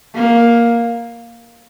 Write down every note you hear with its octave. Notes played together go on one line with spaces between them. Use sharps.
A#3